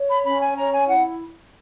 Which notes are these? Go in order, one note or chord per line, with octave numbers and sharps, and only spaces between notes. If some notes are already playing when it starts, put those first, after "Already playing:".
Already playing: C#5
B5
C#4 B5
G#5
C#5 A#5
G#5
E4 F#5